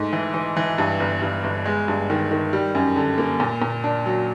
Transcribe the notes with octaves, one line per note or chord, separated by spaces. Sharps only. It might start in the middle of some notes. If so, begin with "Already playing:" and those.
Already playing: G#2 A3
E3
E3
E3
G2
G1
G2
G1
G#3
G2
D#3
D#3
G3
F#2
D3
A#3
A#2
A#2
D4
F#3